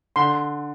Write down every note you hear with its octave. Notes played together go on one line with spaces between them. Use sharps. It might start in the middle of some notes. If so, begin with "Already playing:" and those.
D3 C6